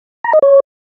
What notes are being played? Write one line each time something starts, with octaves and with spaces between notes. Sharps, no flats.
A#5
D#5
C#5